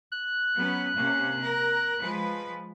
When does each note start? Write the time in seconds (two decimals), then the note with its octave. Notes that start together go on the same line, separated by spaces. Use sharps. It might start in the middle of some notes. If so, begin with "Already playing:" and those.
0.12 F#6
0.55 F#3 B3 C#4
0.96 C3 A#3 C#4
1.44 A#4
1.99 F3 G#3 B4